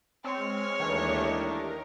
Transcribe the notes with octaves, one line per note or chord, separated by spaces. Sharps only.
G#3 C4 C#5 F6
D#2 E3 A3 A#3 D4 G4 D#5
A#4